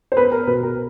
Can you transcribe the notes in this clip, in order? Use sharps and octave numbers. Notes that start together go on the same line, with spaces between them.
C5
B3 B4
A#4
B2 B4
A#4